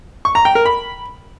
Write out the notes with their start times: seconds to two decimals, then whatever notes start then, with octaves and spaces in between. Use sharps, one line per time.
0.25 C#6
0.35 A#5
0.45 G5
0.55 A#4
0.65 B5